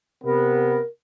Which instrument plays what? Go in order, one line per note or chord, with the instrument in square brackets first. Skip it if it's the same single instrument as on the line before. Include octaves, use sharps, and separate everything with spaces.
[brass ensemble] C3 B3 [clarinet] A#4